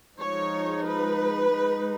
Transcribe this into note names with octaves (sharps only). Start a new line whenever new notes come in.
F3 G#3 D#4 C#5
B4
G#3 D#4